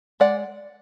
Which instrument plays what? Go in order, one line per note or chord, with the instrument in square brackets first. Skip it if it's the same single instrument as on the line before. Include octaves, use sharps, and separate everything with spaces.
[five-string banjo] G#3 D5 F#5